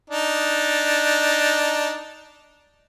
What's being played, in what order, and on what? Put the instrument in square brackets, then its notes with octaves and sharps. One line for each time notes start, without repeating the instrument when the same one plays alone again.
[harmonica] D4 D#4